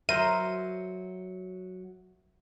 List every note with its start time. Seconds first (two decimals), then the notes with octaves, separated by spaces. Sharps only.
0.09 F#3 F#4 A#4 C5 E5 D#7